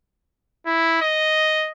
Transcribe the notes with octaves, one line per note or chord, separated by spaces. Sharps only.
E4
D#5